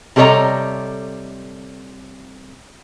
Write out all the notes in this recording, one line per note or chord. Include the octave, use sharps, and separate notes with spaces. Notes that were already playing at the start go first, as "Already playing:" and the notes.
C3 G3 A4 C#5 D#5 A#5